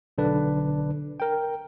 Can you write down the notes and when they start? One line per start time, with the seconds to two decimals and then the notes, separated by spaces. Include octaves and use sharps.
0.18 B1 D3 D4 B4
1.20 A#4 G5